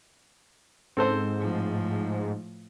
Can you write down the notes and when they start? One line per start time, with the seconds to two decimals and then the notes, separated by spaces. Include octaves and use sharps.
0.97 G#2 C4 A4 C5
1.39 A2 F3